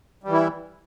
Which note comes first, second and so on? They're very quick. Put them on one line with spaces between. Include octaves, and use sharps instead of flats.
G3 E3 E4